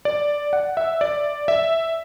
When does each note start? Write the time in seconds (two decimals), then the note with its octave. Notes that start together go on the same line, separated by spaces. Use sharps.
0.05 D5
0.53 F#5
0.77 E5
1.01 D5
1.48 E5